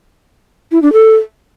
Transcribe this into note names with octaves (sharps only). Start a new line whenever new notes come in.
E4
D4
A4